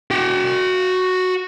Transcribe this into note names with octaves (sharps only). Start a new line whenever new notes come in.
F#4 G5